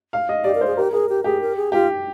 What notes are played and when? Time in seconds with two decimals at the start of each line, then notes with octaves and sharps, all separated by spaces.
0.13 F5
0.29 D#5
0.44 G4 D5
0.55 A#4
0.61 C5
0.67 G#4
0.77 G4 A#4
0.92 G#4 A#4
1.09 G4
1.24 G4 G#4
1.41 A#4
1.56 G#4
1.72 F4 G4